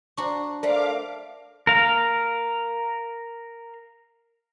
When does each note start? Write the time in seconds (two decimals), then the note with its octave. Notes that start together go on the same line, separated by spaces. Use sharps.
0.17 D4 F#4 C5 A#5 C#6
0.63 A3 A#4 C5 D5 F5 F#5 B5 D6
1.67 A#4 F5